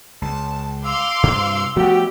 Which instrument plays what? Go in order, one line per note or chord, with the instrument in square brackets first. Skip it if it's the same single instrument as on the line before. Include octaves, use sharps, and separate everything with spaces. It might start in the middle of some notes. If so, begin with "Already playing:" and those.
[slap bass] C#2 [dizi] A5
[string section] F5 C6 D6 [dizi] E6
[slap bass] G2 C3
[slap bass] F3 A3 B3 [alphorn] F#4 [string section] G4